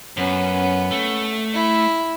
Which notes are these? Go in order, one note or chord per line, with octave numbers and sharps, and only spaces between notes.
F#2 B3 C#4
A3
E4